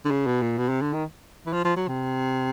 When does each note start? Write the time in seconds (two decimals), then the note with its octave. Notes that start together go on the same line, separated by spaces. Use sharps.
0.05 D3
0.11 C#3
0.26 B2
0.41 A#2
0.58 B2
0.69 C3
0.81 D3
0.93 D#3
1.46 E3
1.53 F3
1.65 F3
1.76 F#3
1.88 C3